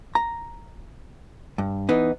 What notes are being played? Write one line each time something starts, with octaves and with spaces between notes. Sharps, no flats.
A#5
G2
E3 B3 D#4